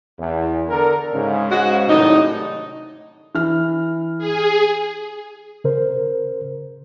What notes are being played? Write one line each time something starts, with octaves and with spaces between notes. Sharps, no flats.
E2
D3 A4 A#4
G#2 C#3
G#3 F#4
A2 C3 D#3 F#3 D4 D#4
E3 F6
G#4
C#3 A#4 C5